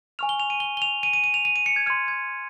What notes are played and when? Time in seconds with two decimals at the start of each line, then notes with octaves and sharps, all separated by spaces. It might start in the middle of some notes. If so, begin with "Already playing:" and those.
0.19 G#5 C#6 F6 F7
0.29 G7
0.40 F7
0.50 D#7
0.60 G7
0.77 G7
0.82 F7
1.03 D#7
1.13 D#7
1.24 D#7
1.34 F7
1.45 D#7
1.56 D#7
1.66 C#7
1.76 G#6
1.86 C6 F6 G#6
2.08 G#6